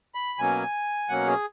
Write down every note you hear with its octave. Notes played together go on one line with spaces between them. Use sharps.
B5
B2 F#3 A#3 C#4 G#5
B2 F#3 A#3 C#4 F#5
G#4